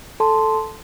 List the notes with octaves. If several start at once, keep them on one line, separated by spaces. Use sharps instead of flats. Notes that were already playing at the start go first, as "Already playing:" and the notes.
A4 A5 C6